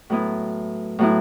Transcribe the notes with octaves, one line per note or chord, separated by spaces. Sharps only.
A2 F#3 B3 E4
A2 F#3 B3 E4